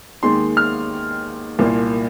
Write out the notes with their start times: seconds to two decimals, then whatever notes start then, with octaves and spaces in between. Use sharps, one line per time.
0.23 D#2 D#3 G#3 C6
0.57 F6
1.59 C2 A#2 A#3